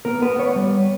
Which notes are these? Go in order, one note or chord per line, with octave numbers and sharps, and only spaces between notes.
B3 A#4
B3 B4
B3 C#5
G3